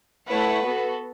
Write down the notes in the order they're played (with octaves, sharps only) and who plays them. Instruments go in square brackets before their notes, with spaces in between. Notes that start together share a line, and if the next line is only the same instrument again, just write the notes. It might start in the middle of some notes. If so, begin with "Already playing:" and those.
[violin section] A3 E4 C#5 F#5 [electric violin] B4
[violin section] B3 F#4 A4